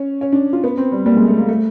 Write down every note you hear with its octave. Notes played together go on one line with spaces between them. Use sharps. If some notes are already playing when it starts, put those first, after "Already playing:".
Already playing: C#4
C#4
D4
F4
B3
C4
G3
G3 A#3
G#3
A3
A#3
A3